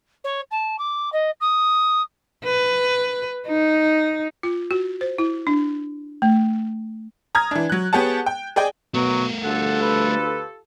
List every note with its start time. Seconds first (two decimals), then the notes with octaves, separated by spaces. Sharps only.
0.24 C#5
0.51 A5
0.78 D6
1.12 D#5
1.40 D#6
2.44 B4
3.47 D#4
4.43 F4
4.71 F#4
5.01 C5
5.18 E4
5.47 D4
6.22 A3
7.35 A#5 D#6 F6 G#6
7.51 E3 D4
7.70 F#3 F#6
7.93 B3 G4 G#4 C#5 F#5 A5
8.26 G5
8.56 G#4 D5 D#5 G5 G#5
8.94 B2 F#3 A3 A#4
9.44 D2 F4 G4 A4 F#5
9.81 B4